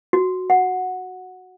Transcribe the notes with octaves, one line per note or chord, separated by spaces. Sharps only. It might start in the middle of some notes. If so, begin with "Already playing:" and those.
F#4
F#5